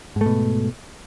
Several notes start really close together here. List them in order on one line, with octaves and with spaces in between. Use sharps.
G#2 A3 B2